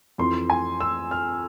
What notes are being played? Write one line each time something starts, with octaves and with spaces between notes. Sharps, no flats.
F2 E3 C6
G#5
E6
F6